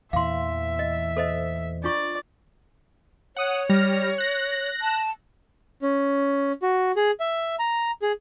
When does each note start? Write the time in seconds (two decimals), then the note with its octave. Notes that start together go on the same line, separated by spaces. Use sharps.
0.13 E2 A#2 E3 E5 F5 C6
0.79 D#5
1.17 A4 C5 D#5
1.84 D4 F4 D5 C#6
3.37 C#5 F#5 D#6
3.70 G3 F6 A#6
4.18 F#6 A#6
4.81 A5
5.82 C#4
6.62 F#4
6.96 G#4
7.20 E5
7.59 A#5
8.02 G#4